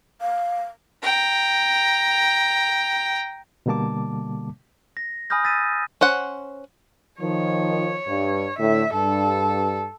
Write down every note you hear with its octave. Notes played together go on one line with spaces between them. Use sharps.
F5
G5 A#5
B2 D3 G3 A#3 A5 D6
A#6
G#5 B5 D#6 F6 G6 A#6
E6 A6 B6 D#7
C#4 C5 F#5
D#3 F3 C#5
G2
A2 D3 E5
G2 A4